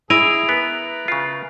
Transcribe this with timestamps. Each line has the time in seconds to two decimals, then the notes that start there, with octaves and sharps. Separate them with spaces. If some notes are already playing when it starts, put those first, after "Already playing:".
0.10 E4 G#4 D#5 G#5 D7 F7
0.49 B3 A#4 B4
1.08 C#3 F4